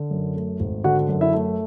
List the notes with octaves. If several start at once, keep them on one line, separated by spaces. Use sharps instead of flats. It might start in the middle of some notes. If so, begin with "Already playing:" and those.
Already playing: D3
F#2
A3
G#1
D3 F#4 F#5
F#2
E4 E5
A3